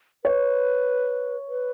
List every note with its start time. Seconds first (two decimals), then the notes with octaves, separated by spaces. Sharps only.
0.25 B4 C#5
1.48 B4